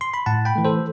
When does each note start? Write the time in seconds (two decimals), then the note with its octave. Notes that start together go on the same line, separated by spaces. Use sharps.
0.01 C6
0.14 B5
0.26 A2 F#5 A5
0.45 G5 B5
0.56 E3 A3
0.65 A4 C5